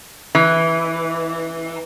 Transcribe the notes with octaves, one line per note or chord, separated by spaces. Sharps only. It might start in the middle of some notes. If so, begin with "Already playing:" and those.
E3